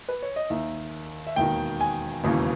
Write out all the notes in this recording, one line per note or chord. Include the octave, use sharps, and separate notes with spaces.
B4
C#5
D#5
D#2 D#3 E5
E5
E1 D#2 D#3 G5
G#5
E1 D#2 C#3 E3